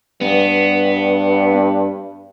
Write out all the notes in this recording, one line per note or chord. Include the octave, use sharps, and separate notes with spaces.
G2 B3